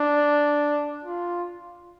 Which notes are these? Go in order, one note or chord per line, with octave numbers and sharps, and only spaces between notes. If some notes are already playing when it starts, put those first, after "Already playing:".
Already playing: D4
F4